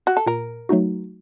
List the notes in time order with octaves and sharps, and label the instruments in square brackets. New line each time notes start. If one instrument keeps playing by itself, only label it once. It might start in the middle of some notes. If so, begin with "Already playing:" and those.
[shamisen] F#4
A4
[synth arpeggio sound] A#2 [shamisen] A#4
[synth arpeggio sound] F#3 A3 D#4 F#4